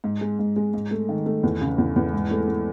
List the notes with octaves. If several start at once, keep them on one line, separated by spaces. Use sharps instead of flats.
G#2
G#3
G#2
G#3
G#2
A3
D#3
A3
E2
C#3
E2
E2
G#2
A3
A3